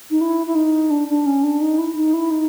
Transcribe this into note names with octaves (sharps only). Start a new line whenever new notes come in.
D#4
E4
E4
D#4
D4
D4
C#4
D4
D#4
E4
D#4
E4
D#4